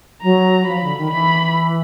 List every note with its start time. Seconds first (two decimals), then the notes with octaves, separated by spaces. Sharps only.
0.22 F#3 A#5
0.67 F3 B5
0.82 D3
0.97 D#3
1.11 E3 B5